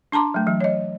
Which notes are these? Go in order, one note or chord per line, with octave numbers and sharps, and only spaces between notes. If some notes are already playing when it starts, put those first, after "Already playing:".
D4 A5 A#5 C6 D6
F#3 A3
E3 F#3
C#5 D#5